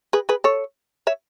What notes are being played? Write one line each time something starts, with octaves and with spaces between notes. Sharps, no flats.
G#4 B4
G#4 B4
A4 C#5
C#5 E5